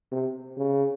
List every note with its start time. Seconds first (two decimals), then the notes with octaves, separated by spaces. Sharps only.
0.12 C3
0.58 C#3